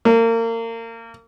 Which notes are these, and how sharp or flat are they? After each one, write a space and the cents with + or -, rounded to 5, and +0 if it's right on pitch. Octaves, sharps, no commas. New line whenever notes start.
A#3 -30